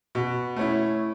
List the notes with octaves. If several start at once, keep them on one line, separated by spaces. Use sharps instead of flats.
B2
A3 C#4 E4